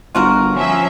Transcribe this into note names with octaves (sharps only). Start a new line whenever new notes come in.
G1 F4 F#4 A#4
F3 C#4 E5